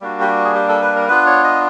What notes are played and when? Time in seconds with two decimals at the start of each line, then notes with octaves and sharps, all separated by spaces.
0.01 G3 A#3 D4 F#4
0.21 G4
0.28 F#4
0.45 G#4
0.55 G4
0.69 A4
0.82 B4
0.96 A#4
1.08 B3 D4 F4 B4
1.26 C#5
1.44 D#5